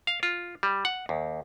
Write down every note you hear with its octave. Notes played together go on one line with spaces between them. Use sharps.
F5
F4
G3
F#5
D#2